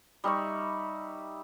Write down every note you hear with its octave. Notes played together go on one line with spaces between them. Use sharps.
G3 D#4 E5 C#6